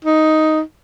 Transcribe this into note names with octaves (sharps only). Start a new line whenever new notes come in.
D#4